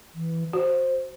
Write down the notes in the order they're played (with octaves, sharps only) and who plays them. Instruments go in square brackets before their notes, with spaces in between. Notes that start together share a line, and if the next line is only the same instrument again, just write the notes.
[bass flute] E3
[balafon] F#4 [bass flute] C5